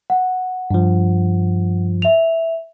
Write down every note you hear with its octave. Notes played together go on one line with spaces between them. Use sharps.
F#5
G2 F3
E5 F7